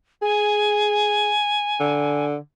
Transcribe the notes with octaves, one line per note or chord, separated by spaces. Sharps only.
G#4 G#5
D3